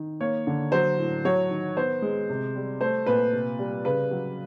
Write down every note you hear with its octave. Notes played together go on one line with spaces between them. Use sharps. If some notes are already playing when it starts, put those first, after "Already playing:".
Already playing: D#3
A#3 C#5
D3
F#3 C5
A2
F#3 C#5
D#3
B3 C5
G#3
C3
G3
A3 C5
A#2 B4
C3
G3
C#3 B4
F#3